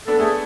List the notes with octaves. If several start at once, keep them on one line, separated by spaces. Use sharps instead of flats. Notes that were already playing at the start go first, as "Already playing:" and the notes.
B3 D4 A4
A3 G#4